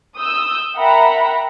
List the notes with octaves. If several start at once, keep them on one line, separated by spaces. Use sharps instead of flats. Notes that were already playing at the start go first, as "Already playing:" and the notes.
D#6 E6 G6
A#4 E5 F#5 G5 A#5 B5